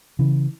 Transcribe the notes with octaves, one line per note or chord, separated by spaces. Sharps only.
C#3 E3